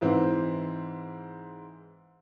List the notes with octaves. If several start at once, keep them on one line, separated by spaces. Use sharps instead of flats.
G#2 E3 C4